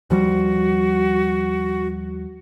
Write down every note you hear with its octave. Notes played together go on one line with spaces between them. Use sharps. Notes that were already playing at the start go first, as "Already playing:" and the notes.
D#2 F3 G3 F#4